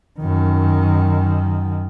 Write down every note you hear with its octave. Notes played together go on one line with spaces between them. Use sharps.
F#2 D#3